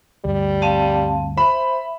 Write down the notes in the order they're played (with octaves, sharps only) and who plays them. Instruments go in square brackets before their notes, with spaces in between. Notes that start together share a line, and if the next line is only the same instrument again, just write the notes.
[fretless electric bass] D2 G2 [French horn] G3
[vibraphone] C4 F5 A5 [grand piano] D#7
[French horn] C5 [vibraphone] E5 [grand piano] B5